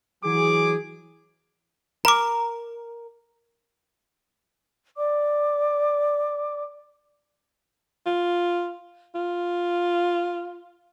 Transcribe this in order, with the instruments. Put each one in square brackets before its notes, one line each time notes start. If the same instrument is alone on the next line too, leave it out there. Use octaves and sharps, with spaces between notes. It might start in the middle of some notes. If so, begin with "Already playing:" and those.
[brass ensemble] E3 F#3 G#4 [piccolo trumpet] D6
[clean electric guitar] A#4 [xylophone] A#5 D6
[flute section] D5 D6
[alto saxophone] F4
F4